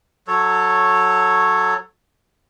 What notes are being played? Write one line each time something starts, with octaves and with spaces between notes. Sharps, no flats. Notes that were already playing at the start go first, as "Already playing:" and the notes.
F#3 A4 C#5